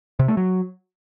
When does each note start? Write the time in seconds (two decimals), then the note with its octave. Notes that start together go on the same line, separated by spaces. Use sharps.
0.19 C3
0.28 A3
0.37 F#3